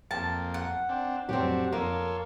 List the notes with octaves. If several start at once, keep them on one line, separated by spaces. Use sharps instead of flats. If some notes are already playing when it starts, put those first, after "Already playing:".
F2 A#3 A5
F#5
C4 D4
F2 A2 F#3 C4 D4 F#4 G4
F2 A#3 F4 A4 C#5